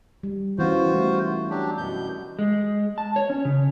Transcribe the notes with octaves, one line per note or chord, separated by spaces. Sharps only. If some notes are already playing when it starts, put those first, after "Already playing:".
G3
E3 B3 C#4 F4 F#4 C5
G3 A3 E4
F#3 D4 G4
F#2 B2 G6
G#3
A5
C#5
C#4
C#3